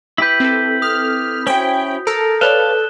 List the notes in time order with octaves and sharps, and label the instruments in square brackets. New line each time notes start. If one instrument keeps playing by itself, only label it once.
[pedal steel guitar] E4 G4 B4 [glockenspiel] G6 B6
[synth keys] C4 A4
[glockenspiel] D#6 [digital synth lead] F6
[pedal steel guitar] C#4 E4 [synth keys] F#4 C5 [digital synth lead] G5
[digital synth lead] A4 [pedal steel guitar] A#4
[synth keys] B4 C#5 D5 [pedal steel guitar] F5 A5 [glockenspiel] F#6 E7 G7